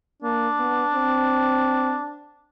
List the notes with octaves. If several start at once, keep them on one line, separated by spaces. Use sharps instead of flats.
A#3 D4
B3
C4